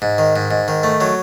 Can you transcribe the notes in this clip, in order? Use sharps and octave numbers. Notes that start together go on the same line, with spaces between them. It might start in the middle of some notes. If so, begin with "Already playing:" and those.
G#2
D#3
G#2
G#2
D#3
A3
F#3